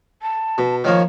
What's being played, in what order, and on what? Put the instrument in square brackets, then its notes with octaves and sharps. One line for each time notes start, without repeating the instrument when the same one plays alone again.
[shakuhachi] A5
[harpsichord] B2
[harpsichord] D#3 F3 A#3 [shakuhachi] C#5